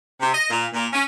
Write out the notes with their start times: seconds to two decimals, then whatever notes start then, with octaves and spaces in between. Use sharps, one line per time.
0.20 C3
0.33 D#5
0.50 A#2
0.73 A#2
0.93 C#4